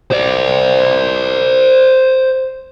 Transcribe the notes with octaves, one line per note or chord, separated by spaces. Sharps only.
C5 D5